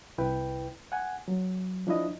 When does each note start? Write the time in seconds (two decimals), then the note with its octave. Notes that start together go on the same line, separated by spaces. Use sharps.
0.18 C2 E4 B4 G5
0.92 F#5 G#5
1.28 F#3
1.87 F3 D4 E4 D#5